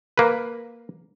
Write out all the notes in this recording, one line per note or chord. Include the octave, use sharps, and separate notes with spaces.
A#3 B4